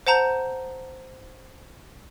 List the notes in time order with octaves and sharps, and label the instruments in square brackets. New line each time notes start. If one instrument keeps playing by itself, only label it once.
[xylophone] C5 F#5 A5 A#5 G6